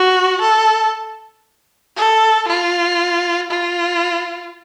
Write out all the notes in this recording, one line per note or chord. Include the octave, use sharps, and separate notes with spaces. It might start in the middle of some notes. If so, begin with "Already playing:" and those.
Already playing: F#4
A4
A4
F4
F4